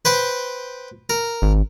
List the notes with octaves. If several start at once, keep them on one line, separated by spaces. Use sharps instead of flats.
B4 C5 G5
A#4
G#1